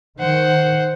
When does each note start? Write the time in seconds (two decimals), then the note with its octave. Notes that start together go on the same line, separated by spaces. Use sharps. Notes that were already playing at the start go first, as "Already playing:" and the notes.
0.19 D#3 C5 F#5